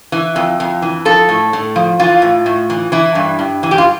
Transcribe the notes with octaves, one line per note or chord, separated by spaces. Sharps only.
E3
F2
F2
E3
F3 A4
A2
A2
F3
E3 F4
A2
A2
E3
E3 E4
G2
G2
E3
G4
F4